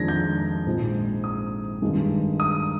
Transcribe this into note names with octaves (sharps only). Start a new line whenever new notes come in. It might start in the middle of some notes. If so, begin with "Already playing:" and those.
Already playing: F2 D#3 G#3 D4 G#6 A#6
G6
A#1 G#2 F3 G#3 C4
D#6
G2 D#3 G#3
D#6